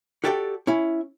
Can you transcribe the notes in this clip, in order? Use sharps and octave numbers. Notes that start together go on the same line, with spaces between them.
F#4 G4 A4 D5 D#5 G5
C#4 E4